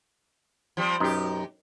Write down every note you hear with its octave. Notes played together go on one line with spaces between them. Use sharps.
F3 G3 C4
F#2 B2 D#4 G4